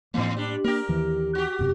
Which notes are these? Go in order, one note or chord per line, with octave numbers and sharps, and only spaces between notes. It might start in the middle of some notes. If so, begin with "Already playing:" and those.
E2 A2 A#3 C4
G3 D4
A#3 D4 G4 A#4
D#2 D#3 E3
F#4 G4
E1 F#2 C3